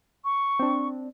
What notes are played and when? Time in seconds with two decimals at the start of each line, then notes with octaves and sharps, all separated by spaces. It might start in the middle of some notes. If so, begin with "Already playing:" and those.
0.25 C#6
0.59 C4 D4